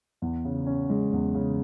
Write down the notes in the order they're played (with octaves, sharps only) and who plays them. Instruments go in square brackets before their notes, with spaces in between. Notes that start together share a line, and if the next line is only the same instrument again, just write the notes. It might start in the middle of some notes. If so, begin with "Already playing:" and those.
[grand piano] E2
C#3
C#4
G#3
E2
C#3